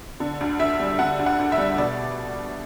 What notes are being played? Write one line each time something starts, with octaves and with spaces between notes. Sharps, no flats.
D3
D2
D2 E5
G3
D3 F#5
D2
F#5
D2
E5
G3
B2 D5